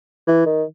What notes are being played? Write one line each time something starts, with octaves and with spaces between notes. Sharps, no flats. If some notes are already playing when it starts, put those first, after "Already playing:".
E3
D#3